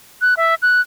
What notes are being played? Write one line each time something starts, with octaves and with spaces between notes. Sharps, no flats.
F#6
E5
F#6